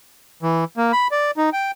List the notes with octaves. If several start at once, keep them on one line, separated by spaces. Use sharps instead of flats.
E3
A#3
B5
D5
D#4
G5